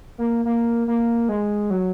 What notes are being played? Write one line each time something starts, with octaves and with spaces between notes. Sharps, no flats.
A#3
A#3
A#3
G#3
F#3